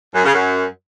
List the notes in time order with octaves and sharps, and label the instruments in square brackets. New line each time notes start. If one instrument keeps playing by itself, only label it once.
[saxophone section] F#2
C#3
F#2